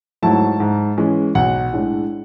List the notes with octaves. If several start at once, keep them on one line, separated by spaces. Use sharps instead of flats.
G#2 F#3 A3 E4 A5
G#2
E3 G#3 C#4
B1 F#5
A2 G#3 D4